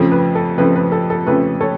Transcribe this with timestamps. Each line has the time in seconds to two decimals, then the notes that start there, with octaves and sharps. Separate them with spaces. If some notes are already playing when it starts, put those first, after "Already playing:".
Already playing: F2 C#3 F3 A3
0.12 B4
0.35 A4
0.58 F2 C#3 F3 A3 B4
0.76 B4
0.92 A4
1.10 A4
1.26 F2 C#3 F3 A3 B4
1.61 A4 C#5